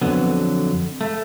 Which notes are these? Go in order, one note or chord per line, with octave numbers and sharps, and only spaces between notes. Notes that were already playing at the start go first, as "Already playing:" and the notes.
F2 D3 F#3 B3
A3